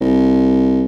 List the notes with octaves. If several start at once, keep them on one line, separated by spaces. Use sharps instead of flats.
C2